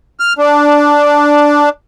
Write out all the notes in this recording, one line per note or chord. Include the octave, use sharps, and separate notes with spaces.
F6
D4